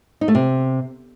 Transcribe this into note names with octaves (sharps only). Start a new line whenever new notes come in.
D#4
A3
C3